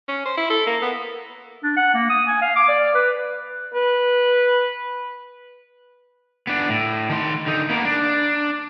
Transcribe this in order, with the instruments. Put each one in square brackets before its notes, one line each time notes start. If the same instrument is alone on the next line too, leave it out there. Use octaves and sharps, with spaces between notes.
[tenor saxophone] C#4
C5
E4
A4
A#3
B3
[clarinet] D4
F#5
A#3
D#6
G#5
F5
D6
D5
B4
[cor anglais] B4
[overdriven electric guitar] B3 D4
A2
D#3 C6
D3 D#4
A#3 B3
D4